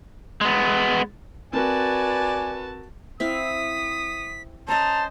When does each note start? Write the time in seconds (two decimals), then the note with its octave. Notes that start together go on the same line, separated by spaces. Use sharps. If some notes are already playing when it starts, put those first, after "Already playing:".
0.41 G#3 B3
1.53 C4 F#4 A#4 B4 D5 G#5 A5
3.20 C4 E4 F5 D#6 B6
4.68 C#4 C5 D#5 A5 A#5